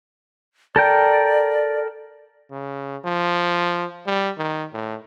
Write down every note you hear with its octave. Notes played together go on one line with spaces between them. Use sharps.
A4 A#4 D5 G5
C#3
F3
G3
D#3
A2